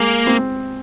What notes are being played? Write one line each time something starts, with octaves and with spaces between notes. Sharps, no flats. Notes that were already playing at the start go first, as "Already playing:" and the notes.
Already playing: G#3 A#3
C4